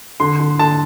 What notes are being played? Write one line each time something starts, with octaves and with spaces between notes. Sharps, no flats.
D3 C6
D3
D3 A5